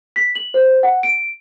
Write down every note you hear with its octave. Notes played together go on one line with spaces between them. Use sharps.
B6
F#7
C5
F#5
D7